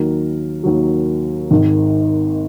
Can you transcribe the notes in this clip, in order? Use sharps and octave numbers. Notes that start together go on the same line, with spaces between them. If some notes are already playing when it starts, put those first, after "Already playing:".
Already playing: D#2 D#3 F#3 A#4
D#2 D#3 F#3
G#1 G#2 D#3